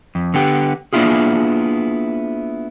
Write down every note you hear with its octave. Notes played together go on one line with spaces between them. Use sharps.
F2
D3 B3 G4
A#3 B3 D4 E4 F4 G#4